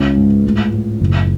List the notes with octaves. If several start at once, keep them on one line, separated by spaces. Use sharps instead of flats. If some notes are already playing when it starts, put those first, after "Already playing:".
Already playing: C#2 C#4
G#2
A2
A2
F#1